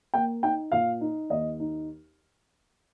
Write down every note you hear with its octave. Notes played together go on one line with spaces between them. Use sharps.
A#3 G5
D#4 G5
A#2 F5
D#4
D#2 D#5
D#4